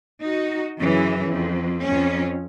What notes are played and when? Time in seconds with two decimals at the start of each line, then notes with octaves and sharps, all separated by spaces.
0.21 D#4 F#4
0.79 F#2 C#3 E3
1.28 F2
1.82 F2 C#4